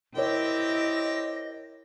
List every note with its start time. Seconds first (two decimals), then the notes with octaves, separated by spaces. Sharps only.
0.15 C4 E4 G4 A#4 C#5 D#5 G5